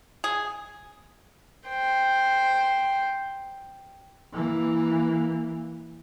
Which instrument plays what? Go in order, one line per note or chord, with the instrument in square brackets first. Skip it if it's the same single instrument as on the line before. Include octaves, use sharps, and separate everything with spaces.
[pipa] G#4
[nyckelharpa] C5 G5
[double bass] E3 A#3